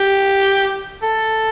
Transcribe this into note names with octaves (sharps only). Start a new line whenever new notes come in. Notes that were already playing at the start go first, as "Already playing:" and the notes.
Already playing: G4
A4